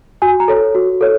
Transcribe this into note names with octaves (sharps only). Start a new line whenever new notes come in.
F#4 G#5
A#5
A4 C#5
F#4
A4 C#5